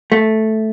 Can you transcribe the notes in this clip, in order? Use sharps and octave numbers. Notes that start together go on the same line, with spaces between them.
A3